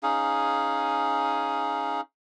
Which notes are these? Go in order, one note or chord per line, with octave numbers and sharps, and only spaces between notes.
C#4 D#4 G#4 F5